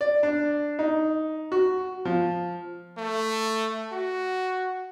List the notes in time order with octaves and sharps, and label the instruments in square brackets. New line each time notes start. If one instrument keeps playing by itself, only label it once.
[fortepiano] D5
D4
D#4
F#4
F3
[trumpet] A3
F#4